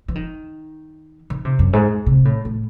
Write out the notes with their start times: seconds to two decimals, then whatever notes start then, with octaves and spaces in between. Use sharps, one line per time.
0.08 E3
0.15 D#3
1.30 D#3
1.45 C3
1.59 F#2
1.73 G#2
2.06 C3
2.25 A2
2.45 A2